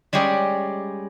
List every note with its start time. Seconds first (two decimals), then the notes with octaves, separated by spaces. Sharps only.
0.13 G3 G#3 C#4 G4 G#4 D5